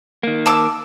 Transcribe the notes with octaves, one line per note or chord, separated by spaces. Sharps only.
D#3 A#3
A5 D6 E6